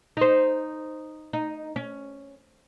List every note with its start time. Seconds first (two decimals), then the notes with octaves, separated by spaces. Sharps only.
0.17 D#4 C5
1.33 D#4
1.76 C#4